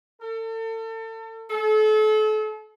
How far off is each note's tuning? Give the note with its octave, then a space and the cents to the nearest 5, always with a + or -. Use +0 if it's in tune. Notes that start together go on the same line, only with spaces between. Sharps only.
A4 +35
A4 -35